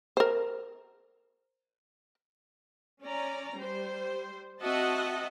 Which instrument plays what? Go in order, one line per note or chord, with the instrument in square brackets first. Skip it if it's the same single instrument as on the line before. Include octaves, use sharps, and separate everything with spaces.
[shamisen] A#4 C5
[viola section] C#4 D5 A#5
G3 C5
C4 F#4 D#5 E5 F#5 A5